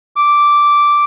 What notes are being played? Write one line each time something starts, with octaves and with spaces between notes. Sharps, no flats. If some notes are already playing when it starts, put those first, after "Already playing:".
D6